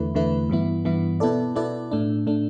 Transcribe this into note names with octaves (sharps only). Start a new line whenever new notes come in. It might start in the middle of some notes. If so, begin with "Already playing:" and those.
Already playing: E2 D3 A3 E4 B4
E2 D3 A3 E4 B4
G2 E3 B3 E4
G2 E3 B3 E4
B2 B3 E4 A4 D5
B2 B3 E4 A4 D5
A2 A3 D4
A2 A3 D4